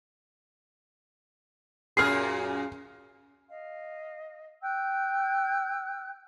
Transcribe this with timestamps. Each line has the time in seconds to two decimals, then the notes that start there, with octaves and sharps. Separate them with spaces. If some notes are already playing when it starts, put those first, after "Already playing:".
1.97 F#2 A#2 G#4 F6 C7
3.49 D#5 F5
4.63 G5 E6 F#6 G6